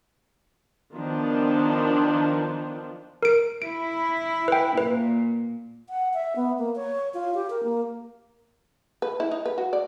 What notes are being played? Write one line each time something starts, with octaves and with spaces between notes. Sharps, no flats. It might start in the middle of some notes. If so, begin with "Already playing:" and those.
D#3 F3 B3 D4 F4
A#4 D7
E4 D7
B4 G5
A#2 B4
F#5
E5
B3
A#3
C#5
F4
G4
A#4
A#3
B4
E4
D#4
B4
F#4
D5